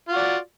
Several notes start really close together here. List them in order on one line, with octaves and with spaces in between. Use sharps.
F4 F#4 D5